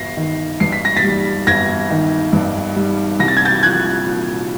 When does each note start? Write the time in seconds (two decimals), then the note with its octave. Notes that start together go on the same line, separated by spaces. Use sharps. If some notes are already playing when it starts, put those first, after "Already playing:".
Already playing: G1 A#6 C7
0.17 D#3
0.60 G2 C7
0.72 B6
0.85 A#6
0.97 A6 B6
1.04 G3
1.47 G1 G#6 A#6
1.90 D#3
2.33 G2
2.76 G3
3.19 C2 A#6
3.28 A6
3.37 G#6
3.45 G6 A6
3.63 F3 F#6 G#6
4.06 A#2